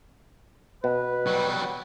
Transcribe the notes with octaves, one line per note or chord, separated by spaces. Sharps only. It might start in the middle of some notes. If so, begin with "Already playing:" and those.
B2 B4
F#3 G3